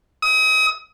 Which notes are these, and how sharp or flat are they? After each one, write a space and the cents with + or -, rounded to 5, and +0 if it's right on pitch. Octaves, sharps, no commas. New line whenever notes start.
D#6 +35